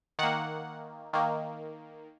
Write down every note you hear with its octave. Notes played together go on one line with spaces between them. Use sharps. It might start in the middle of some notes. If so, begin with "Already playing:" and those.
D#3 A#3 F#5
D#3 A#3